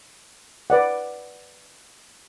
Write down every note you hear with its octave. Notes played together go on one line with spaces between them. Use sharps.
B4 D5 F#5